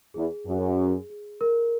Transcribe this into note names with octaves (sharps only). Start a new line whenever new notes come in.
E2 G#4
F#2 G#4
G#4
G#4
A#4